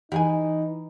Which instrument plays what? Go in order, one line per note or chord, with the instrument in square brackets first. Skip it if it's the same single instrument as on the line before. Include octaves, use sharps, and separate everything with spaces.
[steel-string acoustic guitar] E3 [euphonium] D#4 [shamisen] G4 G#4 G#5